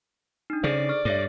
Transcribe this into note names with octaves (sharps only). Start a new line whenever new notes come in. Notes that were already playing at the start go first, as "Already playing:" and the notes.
D4 D#4
C#3 G#4 A4 C5 D5
C#6 F6
G2 A4 C#5 E5